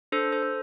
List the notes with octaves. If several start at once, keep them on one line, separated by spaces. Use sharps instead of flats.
D4 A4 C5
A4 C5
A4